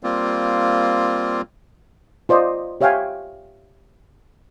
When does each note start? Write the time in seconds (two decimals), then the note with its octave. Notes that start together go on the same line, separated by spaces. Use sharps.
0.03 G3 A#3 C4 F4
2.29 F4 C5 D5 D#5
2.81 G4 C#5 E5 F5 G5 G#5